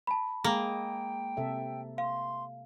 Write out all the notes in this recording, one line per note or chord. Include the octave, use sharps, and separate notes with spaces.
A5 B5
G#3 A#3 G#4 G5
C3 A4 E5
F5 C6